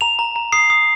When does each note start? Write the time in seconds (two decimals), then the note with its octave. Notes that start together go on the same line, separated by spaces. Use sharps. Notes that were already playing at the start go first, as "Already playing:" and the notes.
0.01 A#5 F7
0.19 A#5
0.36 A#5
0.52 D#6 C7
0.70 D#6